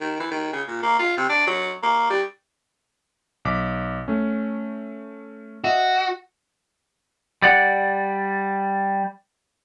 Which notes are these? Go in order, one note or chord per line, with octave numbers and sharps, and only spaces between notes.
D#3
E3
D#3
C#3
A#2
A#3
F4
C3
D4
F#3
A#3
G3
B1 D6 B6
A3 C#4
F#4 D#5 E5
G3 D5 F#5